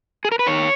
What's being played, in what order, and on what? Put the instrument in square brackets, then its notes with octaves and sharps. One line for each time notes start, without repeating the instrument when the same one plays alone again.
[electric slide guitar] G#4
A#4
B4
D#3 C#5